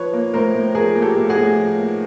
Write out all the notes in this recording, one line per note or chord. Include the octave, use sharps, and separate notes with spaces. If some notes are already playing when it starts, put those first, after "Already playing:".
Already playing: F3 B4 C#5
A#3
A2 A#4 C5
A2
F3 G#4 A#4
A#3
G4 A4
A2
F#4 G#4
A2
F3
A#3